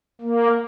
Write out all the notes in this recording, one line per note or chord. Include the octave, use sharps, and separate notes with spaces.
A#3